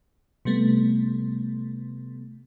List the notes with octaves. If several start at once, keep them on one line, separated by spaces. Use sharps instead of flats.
C3 G3 A3 B3